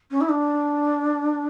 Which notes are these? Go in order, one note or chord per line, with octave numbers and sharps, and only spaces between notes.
C#4
E4
D4